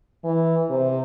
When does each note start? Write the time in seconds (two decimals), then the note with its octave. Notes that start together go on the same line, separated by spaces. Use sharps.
0.24 E3
0.70 C3